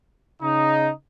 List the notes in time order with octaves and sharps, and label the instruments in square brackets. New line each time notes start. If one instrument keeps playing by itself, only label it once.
[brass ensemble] C#3 D#4